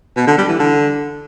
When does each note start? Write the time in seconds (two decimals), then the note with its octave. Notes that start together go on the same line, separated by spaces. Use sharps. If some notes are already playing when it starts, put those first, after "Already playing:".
0.17 B2
0.27 D3
0.38 G3
0.49 E3
0.59 D3